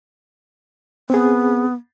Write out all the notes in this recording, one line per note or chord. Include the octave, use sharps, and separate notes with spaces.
B3 C4 G#4